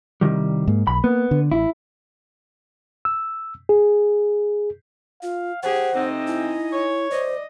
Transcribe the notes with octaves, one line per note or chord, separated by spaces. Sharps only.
C2 D#3 G3
G#2 A#3
B1 B5
A#3 B3
D3
A1 E4
E6
G#4
F4 F5
G4 G#4 C5 F#5
C3 A3 C4 D#4 D#5
E4 G#5
C#5
C5 D5 D#5